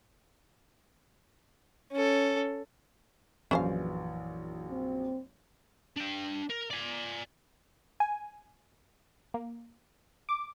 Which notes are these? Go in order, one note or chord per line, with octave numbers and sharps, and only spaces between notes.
C#4 A4
A#1 F#2 E3 C#4 C5 F5
C4
D4 G5
A#4
D5 G#5
G#5
A#3
D6